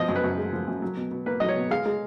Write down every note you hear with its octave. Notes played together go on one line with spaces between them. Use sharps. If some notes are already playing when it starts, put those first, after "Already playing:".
Already playing: B2 F3 D#5
F#2
B4
F#2
G#3
F3
F#2
F#3
B2
B2
A#3 B4
F#3 D#5
C#5
B2
G#3 F5
G#3